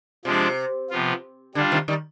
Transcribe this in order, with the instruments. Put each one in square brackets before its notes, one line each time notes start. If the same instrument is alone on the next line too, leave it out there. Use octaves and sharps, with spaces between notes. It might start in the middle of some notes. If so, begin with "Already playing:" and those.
[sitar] C3 [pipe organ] F3 G#3 D4
[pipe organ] C3 F3 B3 F4
[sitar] D3 [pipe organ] G3 D4 F4
[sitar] C3 D#3
D#3 G3